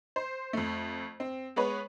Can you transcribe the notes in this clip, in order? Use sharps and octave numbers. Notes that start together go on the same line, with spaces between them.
C5
F2 A3
C4
G#3 B3 B4 C#5